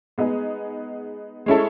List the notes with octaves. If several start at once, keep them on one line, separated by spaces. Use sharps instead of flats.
G#3 B3 D#4 G#4
G#3 C#4 E4 A4